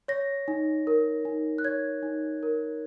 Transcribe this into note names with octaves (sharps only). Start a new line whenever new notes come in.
C#5 A#6
D#4
A#4
D#4
F#6
C#5 G#6
D#4
A#4